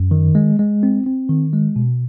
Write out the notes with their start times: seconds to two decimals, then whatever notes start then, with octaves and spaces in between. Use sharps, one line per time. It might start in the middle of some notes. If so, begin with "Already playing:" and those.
Already playing: F#2
0.11 D#3
0.35 G#3
0.59 G#3
0.83 C4
1.07 C4
1.29 D#3
1.53 G#3
1.76 B2